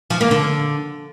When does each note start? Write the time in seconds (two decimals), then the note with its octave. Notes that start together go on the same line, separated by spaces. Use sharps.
0.10 F3
0.21 A#3
0.31 D3